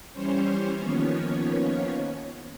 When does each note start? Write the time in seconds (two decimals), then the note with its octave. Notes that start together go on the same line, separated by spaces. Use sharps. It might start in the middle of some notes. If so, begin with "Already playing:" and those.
0.12 E3 G3 C#4 C5 C#5
0.75 D#3 F3 A#3 B3 C#4 C#5